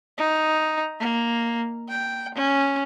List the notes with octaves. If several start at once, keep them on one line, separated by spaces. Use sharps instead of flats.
D#4
A#3
G5
C#4